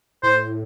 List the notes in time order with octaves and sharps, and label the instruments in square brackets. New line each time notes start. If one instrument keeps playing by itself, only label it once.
[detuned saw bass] A2 [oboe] C5